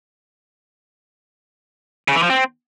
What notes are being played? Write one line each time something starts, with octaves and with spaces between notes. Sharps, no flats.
C#3
E3
F3
C4